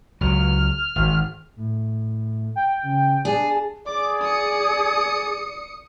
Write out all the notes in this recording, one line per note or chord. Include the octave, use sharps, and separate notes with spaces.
C#2 F#3 F6
G#1
A2
G5
C#3
D4 G#4 A5
G#4 D5 D6
D#6 C#7